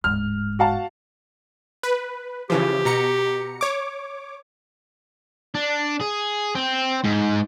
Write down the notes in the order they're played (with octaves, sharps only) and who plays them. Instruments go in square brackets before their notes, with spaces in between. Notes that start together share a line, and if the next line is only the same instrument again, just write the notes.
[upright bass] D1 G#2 [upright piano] F6
[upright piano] F#4 F5 A5
[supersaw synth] B4
[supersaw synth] C#3 E3 F3 [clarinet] G4
[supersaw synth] B2 A#5 C#7
C#5 D6
[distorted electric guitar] D4
G#4
C4
G#2